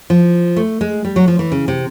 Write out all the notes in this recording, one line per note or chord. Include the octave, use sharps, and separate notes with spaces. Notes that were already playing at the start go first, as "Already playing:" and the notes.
F3
A3
G#3
G3
F#3
F3
E3
C#3
C3